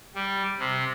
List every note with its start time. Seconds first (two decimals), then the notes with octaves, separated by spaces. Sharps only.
0.15 G3
0.59 C3